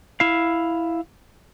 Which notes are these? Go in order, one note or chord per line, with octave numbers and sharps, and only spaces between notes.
E4 F5